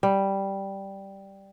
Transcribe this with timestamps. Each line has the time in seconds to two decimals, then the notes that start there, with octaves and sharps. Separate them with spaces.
0.03 G3